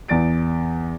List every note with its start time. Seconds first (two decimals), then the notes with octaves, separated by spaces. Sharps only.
0.08 E2 D5 A6 D7